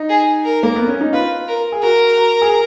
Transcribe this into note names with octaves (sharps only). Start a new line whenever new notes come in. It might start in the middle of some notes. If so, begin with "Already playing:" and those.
Already playing: D#4
G#4
A#4
A#3
B3
C#4
D#4
F4 B4
A#4
G#4
F#4 A#4
F#4
G#4